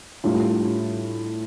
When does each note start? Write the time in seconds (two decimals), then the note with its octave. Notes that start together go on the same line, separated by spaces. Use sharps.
0.24 A2 G3 D4 F4